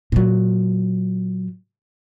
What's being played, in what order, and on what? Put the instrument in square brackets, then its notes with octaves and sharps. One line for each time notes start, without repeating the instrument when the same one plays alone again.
[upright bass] A#2 F#3